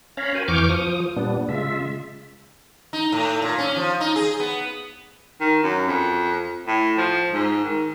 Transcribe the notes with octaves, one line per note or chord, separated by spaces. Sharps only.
C#4 C#5 F5 A#5 B5
F#4 A#4 C5 G#5
F2 E3 C#6 D6 F6 G6
F3 D#6
A#2 G3 B3 D4
C#3 G#3 F4 E5
D#4
A2
A#2
C#4
F3
D#4
G#4
B3
D#3
F#2
F2
A2
F3
G#2
D#3